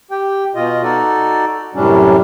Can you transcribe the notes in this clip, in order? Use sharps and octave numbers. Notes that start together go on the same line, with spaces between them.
G4 G5
B2 F4 D#5
D#4 F#4 A4 D5
F#2 A2 C3 G3 C#4 D4